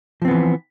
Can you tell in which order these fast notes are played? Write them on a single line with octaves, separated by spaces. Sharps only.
F3 C4 B3 E3